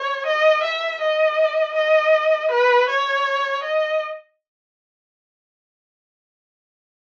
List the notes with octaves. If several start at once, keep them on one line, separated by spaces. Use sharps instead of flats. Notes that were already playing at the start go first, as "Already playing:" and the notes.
Already playing: C#5
D#5
E5
D#5
D#5
B4
C#5
D#5